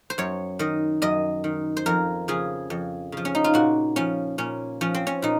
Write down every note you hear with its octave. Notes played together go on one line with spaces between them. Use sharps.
C5
F#2 C#5
D#3 D#5
F#2 D#5
D#3
C5
F2 A#4
C#3 F3 G#4
F2
C#3 F3
C#4
D#4
F4
A#2 F#4
F3 C#4
A#2 C#4
F3 C#4
C4
C#4
A#2 D#4